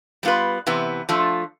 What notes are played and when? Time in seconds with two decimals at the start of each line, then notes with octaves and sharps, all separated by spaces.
0.23 G3 B3 F4 B4
0.67 C3 E3 B3
1.09 F3 A3 D4 F4